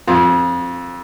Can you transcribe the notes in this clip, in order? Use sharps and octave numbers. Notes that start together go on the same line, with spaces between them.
F2